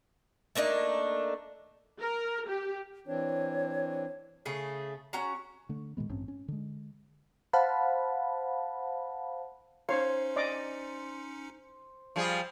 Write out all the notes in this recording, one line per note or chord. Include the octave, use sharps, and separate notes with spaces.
A3 A#3 D4 D#4
A#4
G4
E3 C4 D4 C#5
C#3 A3 G#4
C#4 F#4 A#5
D3 A3
A#2 D#3 G#3 B3
A1 G2 C4 C#4
C#4
D3 G#3
C5 F5 F#5 A5 B5
C#4 D#4 C5 C#5 F5 C#7
D5 D#5 D6
F3 G3 G#4